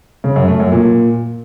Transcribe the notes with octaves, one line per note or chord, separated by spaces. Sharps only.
C#3
F#2
A3
F#2
A#2